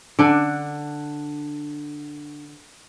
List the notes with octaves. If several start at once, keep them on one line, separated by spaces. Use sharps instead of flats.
D3 D4